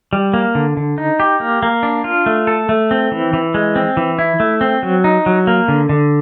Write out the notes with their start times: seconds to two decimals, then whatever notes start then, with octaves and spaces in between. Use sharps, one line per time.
0.13 G3
0.34 A#3
0.55 D3
0.77 D3
0.98 D#4
1.20 G4
1.40 A#3
1.63 A#3
1.83 D4
2.04 F4
2.26 A3
2.47 A4
2.69 A3
2.91 C4
3.12 E3
3.33 E3
3.54 G#3
3.76 C4
3.97 E3
4.19 E4
4.40 A3
4.61 C4
4.83 F#3
5.04 D#4
5.26 F#3
5.47 A#3
5.68 D3
5.89 D3